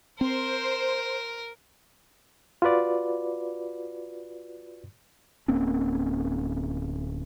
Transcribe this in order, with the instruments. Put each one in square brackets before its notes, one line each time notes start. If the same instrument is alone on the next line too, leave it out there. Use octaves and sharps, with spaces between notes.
[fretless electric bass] C4 [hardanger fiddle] A#4 [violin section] C5
[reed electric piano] F4 F#4 B4 D5
[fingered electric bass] D1 A#3 C4 C#4